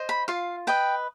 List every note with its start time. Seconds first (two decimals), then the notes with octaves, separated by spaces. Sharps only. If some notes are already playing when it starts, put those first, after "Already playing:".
Already playing: C5 D#5
0.09 B5
0.28 F4 F5
0.67 B4 D#5 G5